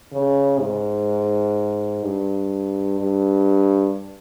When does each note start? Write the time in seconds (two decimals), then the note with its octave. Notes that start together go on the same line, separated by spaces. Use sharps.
0.13 C#3
0.60 G#2
2.03 G2
2.99 G2